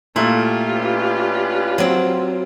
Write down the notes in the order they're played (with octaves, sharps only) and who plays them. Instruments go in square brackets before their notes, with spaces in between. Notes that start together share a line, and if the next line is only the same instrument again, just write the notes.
[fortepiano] A#2 A3 [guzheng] E4 [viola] F4 G4
[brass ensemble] C#4 D4 B4
[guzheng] F#3 C4